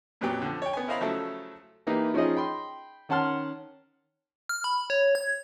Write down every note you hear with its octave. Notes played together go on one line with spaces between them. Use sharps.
F2 A#2 F#3 B3 G4 G5
D3 F3
C#5 G5
B3 G#5
E4 A#4 C5 D#5 F5 B5
C#3 F3 F#3 A3 E4 A4
E3 A#3 D#4 G4 B4
F3 C#4 D#4 F4 G#4 D#5
G5 B5 C6
D#3 C#4 F#5 A5 C6 F6
F6
B5
C#5
G#6